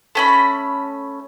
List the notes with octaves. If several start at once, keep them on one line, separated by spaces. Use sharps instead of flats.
A3 C#4 B5